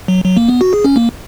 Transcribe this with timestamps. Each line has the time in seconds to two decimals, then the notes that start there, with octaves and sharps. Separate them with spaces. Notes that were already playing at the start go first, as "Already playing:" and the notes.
0.08 F#3
0.25 F#3
0.37 A#3
0.49 B3
0.61 F#4
0.73 G#4
0.84 C#4
0.96 A#3